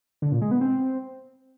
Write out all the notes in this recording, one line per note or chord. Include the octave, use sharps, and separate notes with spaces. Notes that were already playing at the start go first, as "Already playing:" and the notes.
D3
A#2
G#3
B3
C4